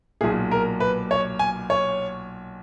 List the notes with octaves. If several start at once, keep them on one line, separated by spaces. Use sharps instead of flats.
B1 A#2 G#4
A#4
B4
C#5
G#5
C#5